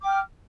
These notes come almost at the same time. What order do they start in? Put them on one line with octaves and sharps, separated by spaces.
D6 G5 F6